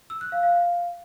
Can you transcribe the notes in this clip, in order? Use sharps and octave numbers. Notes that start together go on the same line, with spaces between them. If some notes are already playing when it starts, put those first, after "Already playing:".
E6
F#6
F5
F5